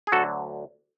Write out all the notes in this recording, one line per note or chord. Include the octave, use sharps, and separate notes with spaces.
G#4
D2 D3 F#3 F#4 A4